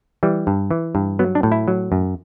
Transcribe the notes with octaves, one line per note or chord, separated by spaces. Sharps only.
E3 G3
G2
E3
G2
F#3 B3
D4
A2
E4
F#3
F#2